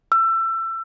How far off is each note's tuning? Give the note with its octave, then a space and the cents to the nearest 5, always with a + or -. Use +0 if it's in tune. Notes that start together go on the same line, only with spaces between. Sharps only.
E6 +25